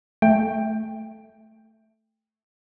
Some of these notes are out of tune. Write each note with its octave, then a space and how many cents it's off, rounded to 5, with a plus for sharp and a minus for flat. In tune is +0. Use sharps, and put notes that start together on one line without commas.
A3 +0 G5 +15